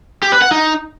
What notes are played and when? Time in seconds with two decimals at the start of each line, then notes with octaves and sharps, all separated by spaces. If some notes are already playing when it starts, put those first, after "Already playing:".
0.23 G4
0.32 B4
0.42 F#5
0.51 D#4